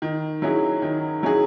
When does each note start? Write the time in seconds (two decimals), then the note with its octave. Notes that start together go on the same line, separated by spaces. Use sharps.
0.02 D#3
0.42 F#3 C#4 E4 G#4
0.82 D#3
1.23 F#3 C#4 E4 G#4